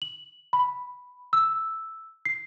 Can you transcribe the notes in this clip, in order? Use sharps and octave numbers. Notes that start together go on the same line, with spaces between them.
F#7
B5
E6
C7